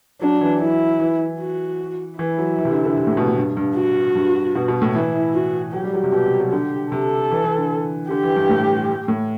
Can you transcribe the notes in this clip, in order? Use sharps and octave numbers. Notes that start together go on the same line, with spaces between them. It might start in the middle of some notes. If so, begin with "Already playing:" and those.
F#3 D4
E3
F#3 E4
E3
F#4
E3 E4
F#3
E3
C3
D3
D3
C3
A2
B2
A2
G2
G2
F#4
G2
B2
B2
A2
E3 E4
F#4
F#3 G4
G3
F#3
C3
B2 G4
C3
F#3
D3 G4
C3 A4
E3
E3
D3
D3 G4
E3
G2
A2
A2